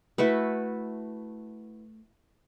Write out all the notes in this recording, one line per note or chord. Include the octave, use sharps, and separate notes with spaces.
A3 E4 F#4 B4